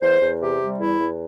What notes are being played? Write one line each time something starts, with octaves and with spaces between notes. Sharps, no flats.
E2 C5
E2
C3 G4
G3
E2 E4
E2